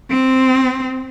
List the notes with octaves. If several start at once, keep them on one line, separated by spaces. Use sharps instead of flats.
C4